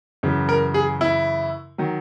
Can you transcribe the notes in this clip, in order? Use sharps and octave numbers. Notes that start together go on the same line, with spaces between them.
F#2 C#3 E3
A#4
G#4
E4
D#3 F#3